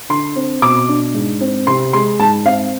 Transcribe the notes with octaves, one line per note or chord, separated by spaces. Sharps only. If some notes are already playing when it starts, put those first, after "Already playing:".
D3 C6
C4
B2 D6
D4
G#2
C4
C3 C6
G#3 C6
G#2 A5
C4 F5